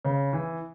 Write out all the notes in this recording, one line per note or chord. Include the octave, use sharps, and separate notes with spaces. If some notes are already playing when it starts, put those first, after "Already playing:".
C#3
E3